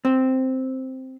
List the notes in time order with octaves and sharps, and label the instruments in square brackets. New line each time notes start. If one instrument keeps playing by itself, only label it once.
[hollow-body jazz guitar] C4